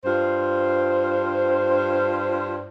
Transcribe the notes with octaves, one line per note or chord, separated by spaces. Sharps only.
G2 F4 C5